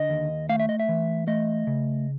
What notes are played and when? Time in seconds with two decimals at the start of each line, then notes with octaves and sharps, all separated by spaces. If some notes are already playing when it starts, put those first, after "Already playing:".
Already playing: D3 D#5
0.10 D#2
0.49 A3 F5
0.60 E5
0.69 D#5
0.80 E5
0.89 E3
1.27 A3 D#5
1.67 C#3